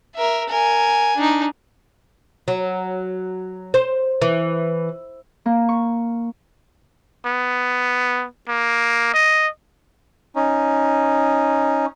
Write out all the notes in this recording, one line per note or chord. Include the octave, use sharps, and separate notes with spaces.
A#4 E5
A#4 G#5
D4 D#4
F#3
C5
E3
A#3
C#6
B3
A#3
D#5
C#4 D#4